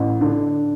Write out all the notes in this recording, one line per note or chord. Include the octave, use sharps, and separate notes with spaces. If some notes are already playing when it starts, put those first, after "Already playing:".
Already playing: A1
D3